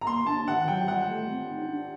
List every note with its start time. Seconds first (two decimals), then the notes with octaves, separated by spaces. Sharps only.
0.01 A#5
0.06 A#3 C6
0.26 D4 A5
0.47 D#3 F#5
0.67 F#3 G5
0.88 G3 F#5
1.08 A3
1.29 C4
1.49 D#4
1.64 C4
1.69 D4